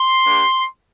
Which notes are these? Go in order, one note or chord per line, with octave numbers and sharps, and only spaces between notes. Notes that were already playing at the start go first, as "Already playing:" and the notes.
Already playing: C6
A#3 D4 G4